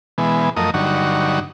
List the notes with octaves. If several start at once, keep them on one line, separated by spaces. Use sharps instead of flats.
B2 E3 G#3 B3
F#2 F3 A3 A#4 D#5 D#6
G2 D3 F#3 D#4 F#4 C#6